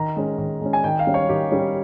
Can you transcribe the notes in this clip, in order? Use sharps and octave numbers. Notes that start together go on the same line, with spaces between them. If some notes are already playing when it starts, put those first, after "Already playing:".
Already playing: D#3 A#5
G#3 C#4
D#3
G#3 C#4
G#5
D#3 G5
F5
G3 C#4
C#5
D#3 G4
G3 C#4